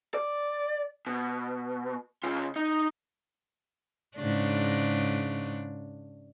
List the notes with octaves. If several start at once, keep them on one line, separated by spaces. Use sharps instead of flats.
D5
B2
C#3 F4
D#4
G#2 C#3 D4